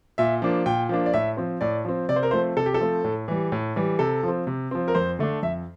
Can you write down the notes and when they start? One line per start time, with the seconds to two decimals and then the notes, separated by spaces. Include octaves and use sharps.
0.18 A#2 E5
0.42 F3 A#3 D4
0.66 A#2 G5
0.89 F3 A#3 D4
1.06 D5
1.14 A2 E5
1.37 F3 C4
1.61 A2 D5
1.85 F3 C4
2.09 C3 D5
2.16 C5
2.23 A#4
2.31 F3 A3 C4 C5
2.57 C3 A4
2.66 G4
2.74 A4
2.80 F3 A3 C4
3.04 A2
3.28 E3 G3
3.52 A2
3.76 E3 G3
3.99 C3 A4
4.23 F3 C4
4.47 C3
4.71 F3 C4
4.88 A#4
4.95 F2 C5
5.19 D3 A3 D4
5.43 F2 E5